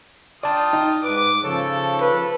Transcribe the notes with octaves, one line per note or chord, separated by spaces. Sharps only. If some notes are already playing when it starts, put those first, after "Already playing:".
F4 D5 G5 A5 D#6
D#4
G#2 B4 D6
C#3 F3 A4 C#5
B4